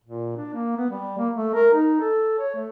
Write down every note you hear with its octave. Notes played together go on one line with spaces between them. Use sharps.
A#2
D4
A#3
B3
G3
A#3
A3
A#4
D#4
A4
C#5
A3